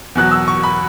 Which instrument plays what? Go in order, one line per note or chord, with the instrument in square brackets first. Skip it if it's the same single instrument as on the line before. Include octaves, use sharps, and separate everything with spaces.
[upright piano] E2 B2 F#3 F#6
E6
C#6
B5